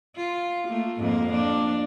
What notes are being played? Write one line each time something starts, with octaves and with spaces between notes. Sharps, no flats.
F4
A3 A#3
F2 G#2 A#3
A#3 D4